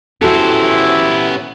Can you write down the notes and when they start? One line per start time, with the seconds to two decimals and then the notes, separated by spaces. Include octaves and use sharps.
0.21 B3 C#4 E4 F#4 G4 A4 C5